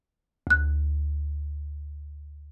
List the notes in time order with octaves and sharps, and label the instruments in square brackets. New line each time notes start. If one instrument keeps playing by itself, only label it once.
[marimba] D2 F#6